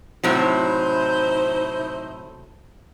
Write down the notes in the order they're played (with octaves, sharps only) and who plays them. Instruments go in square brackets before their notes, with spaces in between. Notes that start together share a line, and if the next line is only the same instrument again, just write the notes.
[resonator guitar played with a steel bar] A2 C3 F#3 [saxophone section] D#4 E4 C5